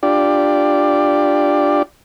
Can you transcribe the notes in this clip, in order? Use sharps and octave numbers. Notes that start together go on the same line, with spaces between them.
D4 F4 G4 D5